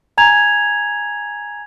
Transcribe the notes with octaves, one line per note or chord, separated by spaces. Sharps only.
G#5 A#5 G#6 F7